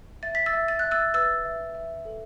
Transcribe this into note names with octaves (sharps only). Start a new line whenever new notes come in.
E5 A6
B6
E6 A6
E5
A6
E5 F#6
E6 A6
B4 E6 A6
E5
E5
A4